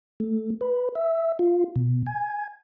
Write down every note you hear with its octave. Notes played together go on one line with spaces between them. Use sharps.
A3
B4
E5
F4
B2
G#5